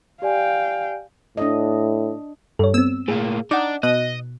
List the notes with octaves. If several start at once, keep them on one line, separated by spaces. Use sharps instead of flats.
G4 D5 F5 G5 G#5
A2 D4 D#5
G2 A4 C#5
B3 C4 E6
A2 A#3 G#4
D4 D#4 F#5 D6
B2 D#5 F#6